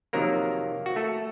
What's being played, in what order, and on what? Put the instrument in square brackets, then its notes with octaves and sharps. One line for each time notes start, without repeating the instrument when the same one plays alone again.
[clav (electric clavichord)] F2 C3 D#3 F#3 A#3 A#4
F#4
A3 A4